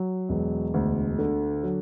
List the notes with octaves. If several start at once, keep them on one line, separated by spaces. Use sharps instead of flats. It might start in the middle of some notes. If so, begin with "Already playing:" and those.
Already playing: F#3
E1
D2
D3
F#3